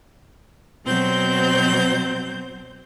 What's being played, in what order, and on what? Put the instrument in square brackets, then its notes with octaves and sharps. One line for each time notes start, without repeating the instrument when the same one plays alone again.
[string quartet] B2 F#3 C4 C5 G6